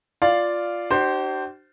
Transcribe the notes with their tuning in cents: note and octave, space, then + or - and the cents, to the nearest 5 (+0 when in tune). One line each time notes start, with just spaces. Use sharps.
F4 +0 D5 +0 F5 -5
D4 +40 G4 -45 C5 +0